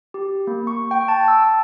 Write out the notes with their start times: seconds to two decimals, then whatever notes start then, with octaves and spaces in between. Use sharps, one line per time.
0.14 G4
0.47 A#3
0.67 C#6
0.91 G5
1.08 A5
1.28 E6